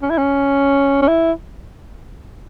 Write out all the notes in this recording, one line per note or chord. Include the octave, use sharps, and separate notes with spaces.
C#4
E4
C#4
C#4
E4